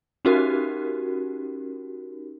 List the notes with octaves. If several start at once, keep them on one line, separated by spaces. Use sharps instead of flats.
C#4 D#4 F#4 G4 A#4